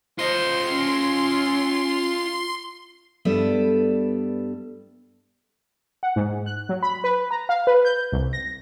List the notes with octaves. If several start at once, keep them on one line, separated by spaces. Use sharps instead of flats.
F4 C5 D#5 C6
C#4
G2 G3 B3 A4 E5
F#5
G#2
F#6
F#3
B5
B4
A#5
F5
B4
G6
C2
A#6